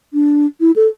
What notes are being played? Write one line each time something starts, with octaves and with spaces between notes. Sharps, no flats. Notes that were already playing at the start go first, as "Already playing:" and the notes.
D4
E4
A4